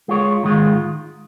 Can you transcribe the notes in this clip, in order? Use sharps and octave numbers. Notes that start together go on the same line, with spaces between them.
G#3 F4 C#5
G#2 D#3 G#3 F4